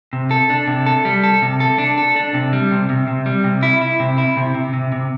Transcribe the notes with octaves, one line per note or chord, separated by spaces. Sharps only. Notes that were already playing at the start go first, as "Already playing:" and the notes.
C3
A4
D4
C3
A4
G3
A4
C3
A4
D4
A4
D4
C3
G3
C3
C3
C3
G3
C3
E4
E4
C3
E4
C3
C3
C3
C3